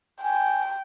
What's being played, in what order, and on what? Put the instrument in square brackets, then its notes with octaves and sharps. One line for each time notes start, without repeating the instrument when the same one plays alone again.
[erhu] G5 [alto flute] G#5